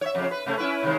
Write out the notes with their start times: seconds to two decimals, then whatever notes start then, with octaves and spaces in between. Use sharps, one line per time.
0.01 C#5 E5
0.15 F2 C#3
0.31 B4
0.46 C3 A3 C#4
0.58 C#4 E4 B4
0.83 C3 D#3 G#3